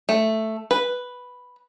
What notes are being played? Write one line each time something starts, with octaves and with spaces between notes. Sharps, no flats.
A3
B4